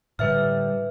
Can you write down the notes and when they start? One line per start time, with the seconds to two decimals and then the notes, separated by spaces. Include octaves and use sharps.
0.19 A2 D3 G3 B4 E5 F6